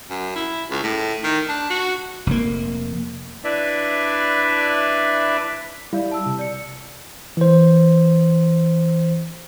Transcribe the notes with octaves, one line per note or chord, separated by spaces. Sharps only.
F#2
E4
C#2
A2
D#3
D4
F#4
F1 A#3
D4 E4 B4 D5 E5
G3 E4 D5 F5
A5 E6
C3
D5 C#7
E3 C5